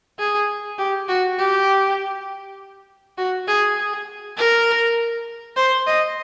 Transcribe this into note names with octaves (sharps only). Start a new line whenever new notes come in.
G#4
G4
F#4
G4
F#4
G#4
G#4
A#4
C5
D#5